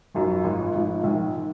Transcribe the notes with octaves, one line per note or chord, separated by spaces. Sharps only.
G#1 F#2 F3
G#1 G#2 F3
G#1 G#2 F3
A#1 G#2 D#3
D#3